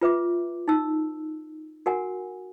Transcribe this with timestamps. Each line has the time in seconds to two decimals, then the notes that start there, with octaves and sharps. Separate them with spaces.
0.01 F4 B4 E5 D6
0.68 D#4 E6
1.86 F#4 A#4 F#5 G#5